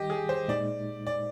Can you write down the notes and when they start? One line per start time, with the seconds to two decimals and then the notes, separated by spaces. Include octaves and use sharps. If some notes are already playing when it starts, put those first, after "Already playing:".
Already playing: D#3 G3 G4 D#5
0.10 G#4
0.29 C5
0.48 A#2 G#3 D#4 D5
1.07 D5